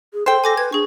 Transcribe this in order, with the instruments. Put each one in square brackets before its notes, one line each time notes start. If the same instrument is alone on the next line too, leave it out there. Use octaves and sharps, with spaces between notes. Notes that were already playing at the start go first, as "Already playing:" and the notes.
[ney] G#4
[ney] A4 [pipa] C5 G5
[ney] A4 [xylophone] G#5 D6 A#6
[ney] B4 [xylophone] G#6
[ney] D4 [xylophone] G#4 C#6